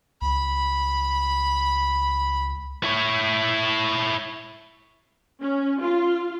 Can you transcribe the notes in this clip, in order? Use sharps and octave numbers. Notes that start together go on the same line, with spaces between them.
C#2 B5
E4 C#5
C#4
F4